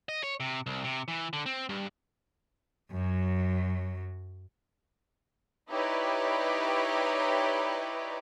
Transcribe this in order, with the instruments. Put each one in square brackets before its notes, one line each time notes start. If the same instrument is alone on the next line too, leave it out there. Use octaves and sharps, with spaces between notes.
[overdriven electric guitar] D#5
C#5
C3
C2
C3
E3
D3
C4
G2
[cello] F#2 F#3
[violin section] D#4 E4 G4 B4 C#5 D5